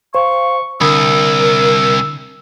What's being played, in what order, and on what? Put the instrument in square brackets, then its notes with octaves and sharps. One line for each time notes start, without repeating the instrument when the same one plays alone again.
[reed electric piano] C5 [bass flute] F5 [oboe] C#6
[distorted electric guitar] C2 [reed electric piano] D3 B5 D#6 [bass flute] A#4 [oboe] E6